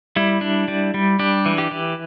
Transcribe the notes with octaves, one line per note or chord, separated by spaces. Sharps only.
G3 E4
D4
G3
G3
D4 G4
E3
G4
E3